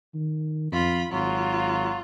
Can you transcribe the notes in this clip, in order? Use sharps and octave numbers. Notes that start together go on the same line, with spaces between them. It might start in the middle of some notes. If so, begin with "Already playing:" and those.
D#3
F2 F4 B5
G#1 F#3 F4